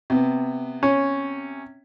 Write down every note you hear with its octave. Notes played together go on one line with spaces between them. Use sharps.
C3 B3
C#4